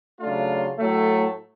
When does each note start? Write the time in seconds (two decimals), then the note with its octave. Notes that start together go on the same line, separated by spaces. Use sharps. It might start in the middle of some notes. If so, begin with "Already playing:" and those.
0.20 C#3 F#3 A3 D4 F4
0.78 A2 F#3 A3